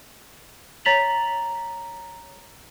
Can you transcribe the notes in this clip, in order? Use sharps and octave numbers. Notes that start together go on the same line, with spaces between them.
C#5 A#5 A6 B6 F7 F#7